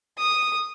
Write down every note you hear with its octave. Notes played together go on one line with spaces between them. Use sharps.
D#6